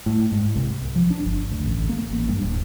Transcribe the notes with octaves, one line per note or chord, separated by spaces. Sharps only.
A2
G#2
C2
F3
D4
G1
D2
A1
A#3
A1
G2
D1